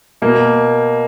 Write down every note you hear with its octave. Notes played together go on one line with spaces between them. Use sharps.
B2 A#3